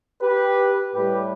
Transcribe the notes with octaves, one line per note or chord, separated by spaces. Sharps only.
G4 B4
A2 G3 G4 B4